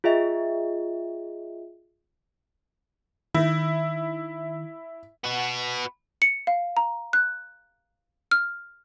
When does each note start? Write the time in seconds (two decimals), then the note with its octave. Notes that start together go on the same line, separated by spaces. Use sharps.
0.04 F4 G#4 D#5 E5 G5
3.35 D#3 E4
5.24 B3 F#4
6.22 C#7
6.47 F5
6.77 A#5
7.13 F#6
8.31 F6